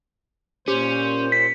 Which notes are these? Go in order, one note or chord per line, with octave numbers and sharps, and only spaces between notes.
A#2 C#4 G4 C5
B6 C#7